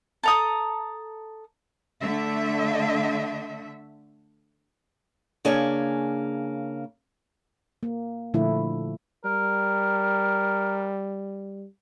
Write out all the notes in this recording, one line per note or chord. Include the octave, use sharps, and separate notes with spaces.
A4 A#5 D#6
D3 A3 E5
C#3 A#3 D4 G#4 C#5
A#3
A#2 D3 F3 A3 E4
G3 A#4